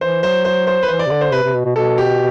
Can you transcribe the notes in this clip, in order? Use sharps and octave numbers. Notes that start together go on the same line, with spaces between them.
E3 C5
F#3 C5
C5
C5
B4
E3 C5
D5
C3
D3 D5
C5
C3 B4
C3
B2
B2
B2 A4
G4